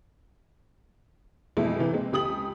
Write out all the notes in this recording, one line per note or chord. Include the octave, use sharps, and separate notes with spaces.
F2 B2 E3 G#3 A3 E4
C3 E3
G#3 C4
C#2 G4 D#6 F#7